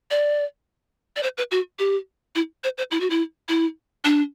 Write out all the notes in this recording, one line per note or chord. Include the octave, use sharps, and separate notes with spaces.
D5
D5
C5
B4
F#4
G4
E4
C5
C5
E4
F#4
E4
E4
D4